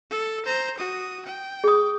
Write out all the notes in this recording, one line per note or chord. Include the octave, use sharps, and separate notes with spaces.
A4
C5 A#5
F#4 D#6
G5
G#4 D#6